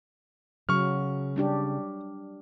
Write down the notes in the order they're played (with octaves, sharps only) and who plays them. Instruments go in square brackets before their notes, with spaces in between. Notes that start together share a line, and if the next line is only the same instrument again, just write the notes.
[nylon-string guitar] C#3 [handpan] F#3 [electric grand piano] C#6 F6
[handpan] G3 D4 G4